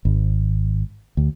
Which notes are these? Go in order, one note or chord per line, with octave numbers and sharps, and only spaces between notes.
G#1
D2